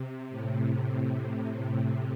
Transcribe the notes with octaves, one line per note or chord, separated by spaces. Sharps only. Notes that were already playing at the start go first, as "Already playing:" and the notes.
Already playing: C3
A2
A2